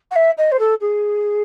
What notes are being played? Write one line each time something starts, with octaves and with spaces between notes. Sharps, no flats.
F#5
E5
D#5
C5
A4
G#4